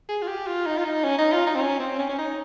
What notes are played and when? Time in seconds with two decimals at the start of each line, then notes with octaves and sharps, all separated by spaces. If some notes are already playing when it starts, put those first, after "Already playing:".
0.09 G#4
0.22 F4
0.28 G4
0.47 F4
0.66 D#4
0.78 F4
0.85 D#4
1.04 C#4
1.18 D#4
1.33 F4
1.47 D#4
1.55 C4
1.61 C#4
1.80 C4
1.99 C#4
2.09 C#4
2.18 D#4